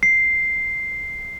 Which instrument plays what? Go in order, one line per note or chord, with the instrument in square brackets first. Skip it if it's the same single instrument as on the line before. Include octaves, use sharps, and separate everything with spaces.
[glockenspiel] C7